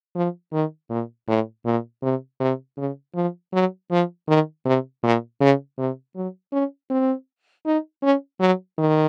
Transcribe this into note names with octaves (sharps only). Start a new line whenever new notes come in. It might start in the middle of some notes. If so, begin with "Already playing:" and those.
F3
D#3
A#2
A2
A#2
C3
C3
C#3
F3
F#3
F3
D#3
C3
A#2
C#3
C3
F#3
C#4
C4
D#4
C#4
F#3
D#3